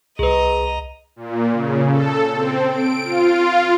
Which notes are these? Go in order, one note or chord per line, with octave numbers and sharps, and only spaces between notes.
C2 G#4 B4 D#5 A#5
A#2
C#3
A4
C4
D7
F4